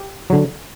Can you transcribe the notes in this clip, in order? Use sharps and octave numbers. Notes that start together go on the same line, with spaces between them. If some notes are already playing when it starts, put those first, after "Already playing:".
Already playing: G4
D3 F#3